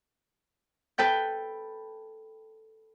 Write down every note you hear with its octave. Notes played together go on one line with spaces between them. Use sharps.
A4 B4 G5 G6